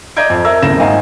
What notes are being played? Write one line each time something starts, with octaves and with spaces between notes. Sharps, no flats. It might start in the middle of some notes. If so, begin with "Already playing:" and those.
D5 D#5 A#5 G6 G#6 D7
F2
A#4 E5 A#5 E6 G#6
D#1 C#3 E4 E5 A#6 E7
G#1 D#3 D#5 F5 G#5 A#5